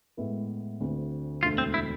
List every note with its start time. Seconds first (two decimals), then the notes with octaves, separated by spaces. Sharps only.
0.17 A2 G#3 B3 E4
0.80 D2 D3 A3 C4
1.43 E1 D2 D3 A3 F4
1.58 C4
1.74 E4